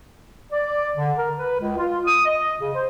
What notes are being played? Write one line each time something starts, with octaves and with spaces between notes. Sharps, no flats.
D5
D3
A#4
B4
C#2
F4
D#6
D#5
C#3
C5